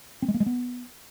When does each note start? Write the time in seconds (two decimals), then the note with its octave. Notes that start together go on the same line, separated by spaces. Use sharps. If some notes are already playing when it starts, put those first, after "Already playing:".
0.22 C4
0.28 G#3
0.34 A#3
0.40 G#3
0.46 B3